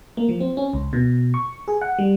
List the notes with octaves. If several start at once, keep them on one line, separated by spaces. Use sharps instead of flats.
A#3
F3
C4
C#4
C#2
B2
C#6
G#4
F#5
G3